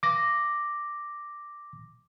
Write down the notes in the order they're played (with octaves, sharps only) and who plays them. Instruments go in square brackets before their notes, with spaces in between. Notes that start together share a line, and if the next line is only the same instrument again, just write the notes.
[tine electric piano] D6 A#6